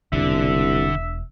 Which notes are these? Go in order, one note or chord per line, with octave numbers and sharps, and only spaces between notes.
E1 C2 D3 D4 E5